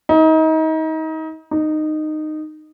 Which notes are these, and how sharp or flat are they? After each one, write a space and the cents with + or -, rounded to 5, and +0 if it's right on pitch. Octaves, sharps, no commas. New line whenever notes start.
D#4 +30
D#4 -15